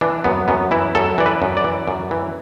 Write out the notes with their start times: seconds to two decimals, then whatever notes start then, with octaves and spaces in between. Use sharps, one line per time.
0.01 E3 D4
0.24 F#2 B3
0.48 F#2 B3
0.71 E3 E4
0.95 F#2 A4
1.18 E3 D5
1.26 B4
1.42 F#2
1.57 D5
1.64 E3
1.88 F#2
2.11 E3